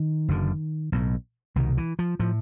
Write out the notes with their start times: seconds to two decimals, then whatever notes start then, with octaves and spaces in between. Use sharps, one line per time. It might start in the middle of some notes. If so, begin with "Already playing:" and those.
Already playing: D#3
0.28 F#1 F#2 D3
0.92 B1 A2
1.56 C2 B2 D#3
1.77 E3
1.99 F3
2.20 A2 F3